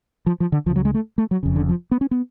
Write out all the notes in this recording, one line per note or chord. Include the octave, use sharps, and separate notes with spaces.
F3
F3
D3
C#2 C#3 F3
F#3
G#3
A3
A3
F#3
F1 F2 C#3
D3
F3
B3
C#4
B3